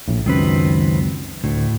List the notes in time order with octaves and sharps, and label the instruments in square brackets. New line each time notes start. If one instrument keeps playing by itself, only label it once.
[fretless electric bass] A#1 A2
[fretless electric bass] C#2 F#2 [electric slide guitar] D#3 C4 B4
[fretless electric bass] D2 [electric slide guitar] A2